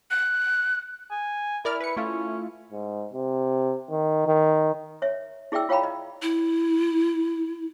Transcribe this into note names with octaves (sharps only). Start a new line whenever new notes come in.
F#6
G#5
E4 A#4 D5 F6
B4 C#7
A3 C#4 E4 F4
G#2
C3
D#3
D#3
C#5 E5
E4 G#4 D5 E5 G5 E6
F4 C#5 F5 G5 A#5 B5
D#5
E4